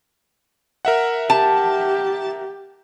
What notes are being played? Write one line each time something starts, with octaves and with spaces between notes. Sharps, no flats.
A#4 E5 F#5
G4 A5